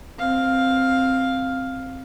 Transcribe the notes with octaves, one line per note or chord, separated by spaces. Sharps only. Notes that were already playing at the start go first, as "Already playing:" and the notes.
C4 F5